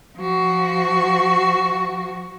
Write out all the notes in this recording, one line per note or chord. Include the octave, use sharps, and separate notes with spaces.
F3 F#4